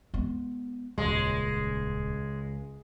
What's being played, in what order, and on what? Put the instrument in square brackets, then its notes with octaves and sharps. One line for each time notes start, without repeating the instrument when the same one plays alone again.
[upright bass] G#3 B3
[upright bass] D#1 [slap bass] C#2 [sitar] G#3